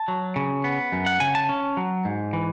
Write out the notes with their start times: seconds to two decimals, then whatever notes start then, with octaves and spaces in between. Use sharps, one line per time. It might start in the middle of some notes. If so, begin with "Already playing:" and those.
Already playing: A5
0.08 F#3
0.36 C#3
0.64 B3
0.92 F#2
1.06 F#5
1.20 C#3 G#5
1.35 A5
1.49 C#4
1.77 F#3
2.05 G#2
2.33 E3